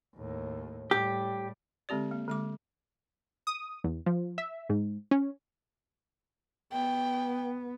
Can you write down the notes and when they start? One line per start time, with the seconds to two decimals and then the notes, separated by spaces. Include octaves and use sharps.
0.16 D#2 A2
0.91 A2 G3 G4
1.89 D3 G#3 C4 G4 D5
2.11 A#3
2.28 D3 G#3 D6
3.47 D#6
3.84 E2
4.06 F3
4.38 E5
4.69 G#2
5.11 C#4
6.73 B3 G5